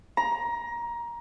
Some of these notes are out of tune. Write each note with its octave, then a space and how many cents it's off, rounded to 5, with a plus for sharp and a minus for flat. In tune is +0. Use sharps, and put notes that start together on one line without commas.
A#5 +20